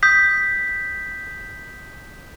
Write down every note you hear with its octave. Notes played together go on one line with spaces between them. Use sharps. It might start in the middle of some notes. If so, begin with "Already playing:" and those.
D#6 G6 B6